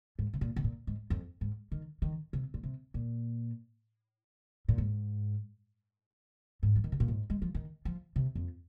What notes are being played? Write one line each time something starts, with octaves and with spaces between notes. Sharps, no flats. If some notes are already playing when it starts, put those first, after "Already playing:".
G#2
C3
A#2
C3
A#2
G#2
F2
G#2
D#3
D#3
C3
A#2
C3
A#2
A#2
G#2
G#2
F3
D#3
C3
A#2
G#2
G#3
F3
D#3
F3
C3
F2